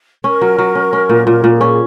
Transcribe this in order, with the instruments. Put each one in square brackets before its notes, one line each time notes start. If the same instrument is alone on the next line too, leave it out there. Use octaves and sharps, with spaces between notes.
[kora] C#4 [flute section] A#4
[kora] F#3
F#3
C#4
C#4
A#2
[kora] A#2 [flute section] A#4
[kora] A#2
[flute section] G#4
[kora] C#4